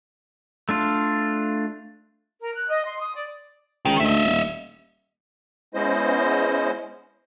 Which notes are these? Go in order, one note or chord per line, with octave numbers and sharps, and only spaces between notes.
A3 D4 F4
A#4
F#6
D#5
C6
D#6
D5
C#2 D#3
D2 D#5 E5
D#1
G#3 B3 C#4 E4 C5 D#5